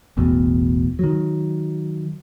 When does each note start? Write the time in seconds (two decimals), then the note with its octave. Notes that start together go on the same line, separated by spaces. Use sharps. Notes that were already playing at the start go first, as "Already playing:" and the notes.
0.17 E1 A1 E2 B2
0.99 D#3 F#3